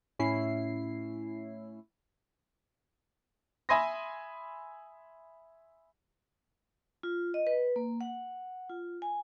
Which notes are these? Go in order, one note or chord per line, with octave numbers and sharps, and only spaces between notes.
A2 C#4 E4 C7
E5 G#5 B5 C6 D#6 A#6
F4
D#5
B4
A#3
F#5
F4
G#5